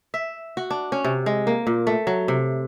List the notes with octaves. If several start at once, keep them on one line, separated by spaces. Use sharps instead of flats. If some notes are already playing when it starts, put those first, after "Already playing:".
E5
F#4
D4
C#4
C3
G#3
A#3
A#2
A3
F#3
C3